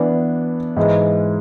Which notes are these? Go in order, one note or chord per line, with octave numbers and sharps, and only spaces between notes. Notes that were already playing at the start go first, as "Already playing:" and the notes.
Already playing: E3 B3 D4
G#2 E3 G#3